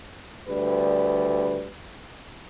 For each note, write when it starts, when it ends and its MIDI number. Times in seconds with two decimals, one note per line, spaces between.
0.48 1.73 38
0.48 1.73 55
0.48 1.73 71